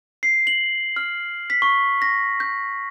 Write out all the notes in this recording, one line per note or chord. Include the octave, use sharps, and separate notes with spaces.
C7
F#7
F6
B6
C#6
A#6
G6